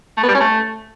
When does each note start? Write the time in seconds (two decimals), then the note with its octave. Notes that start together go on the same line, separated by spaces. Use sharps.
0.17 A3
0.23 B3
0.29 G3
0.35 C#4
0.41 A3